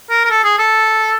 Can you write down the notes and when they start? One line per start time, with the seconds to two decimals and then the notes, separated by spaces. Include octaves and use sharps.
0.10 A#4
0.25 A#4
0.30 A4
0.44 G#4
0.58 A4